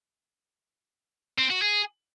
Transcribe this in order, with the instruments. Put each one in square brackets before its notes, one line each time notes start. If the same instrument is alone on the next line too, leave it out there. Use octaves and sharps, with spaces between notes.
[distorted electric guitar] C4
F#4
G#4